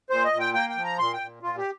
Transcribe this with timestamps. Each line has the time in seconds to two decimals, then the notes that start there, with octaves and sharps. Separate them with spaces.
0.10 A#2 C5
0.25 D#5
0.32 A#2
0.40 G5
0.54 A#3 G5
0.69 G5
0.76 F3
0.84 A#5
0.98 A#2 C6
1.14 G5
1.21 A#2
1.43 A#2 F4
1.57 G4